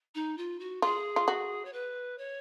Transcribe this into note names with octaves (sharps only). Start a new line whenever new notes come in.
D#4
F4
F#4
F4 G#4
F4
F#4
C#5
B4
C#5